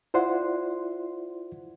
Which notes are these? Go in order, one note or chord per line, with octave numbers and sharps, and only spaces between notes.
E4 F4 C5 D5 F#5 C6